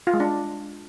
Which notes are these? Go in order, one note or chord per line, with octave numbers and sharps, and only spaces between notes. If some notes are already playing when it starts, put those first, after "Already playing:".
F4
G#3
D4